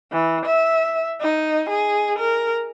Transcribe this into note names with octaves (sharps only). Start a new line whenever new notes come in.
E3
E5
D#4
G#4
A#4